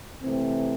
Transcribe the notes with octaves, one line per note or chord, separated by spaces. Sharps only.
C3 E3 A3 C4